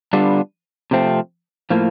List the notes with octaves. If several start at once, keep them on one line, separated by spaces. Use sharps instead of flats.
D3 G3 B3 D4 F4
C3 F3 A3 C4
A2 F3 A#3